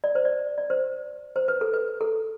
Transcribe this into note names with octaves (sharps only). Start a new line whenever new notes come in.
D5
C5
D5
D5
C5
C5
B4
A4
B4
A4